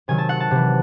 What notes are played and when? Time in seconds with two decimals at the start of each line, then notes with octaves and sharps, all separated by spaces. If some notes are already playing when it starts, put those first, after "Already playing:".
0.08 C3 D#3 F#3 G#5
0.18 A5
0.29 F#5
0.40 A5
0.51 C3 E3